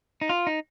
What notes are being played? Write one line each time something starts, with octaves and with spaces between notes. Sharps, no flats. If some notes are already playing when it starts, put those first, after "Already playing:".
D#4
F4
D#4